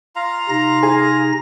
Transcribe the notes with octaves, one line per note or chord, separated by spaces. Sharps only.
F4 F5 A#5
C3 D#4 A#6
G#4